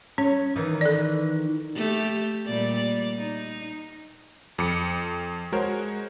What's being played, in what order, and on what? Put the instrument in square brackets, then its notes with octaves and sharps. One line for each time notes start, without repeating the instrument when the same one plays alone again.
[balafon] C#4 [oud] C#5
[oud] D#3 E3 D#4
[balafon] A4 D5
[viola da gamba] A3 G4
A#2 G3 D5
D#4
[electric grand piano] F2 D6 C#7
G#3 F#4 A#4 C5 C#5